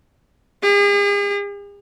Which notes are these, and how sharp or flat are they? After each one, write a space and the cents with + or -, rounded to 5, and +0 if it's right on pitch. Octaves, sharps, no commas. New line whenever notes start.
G#4 -45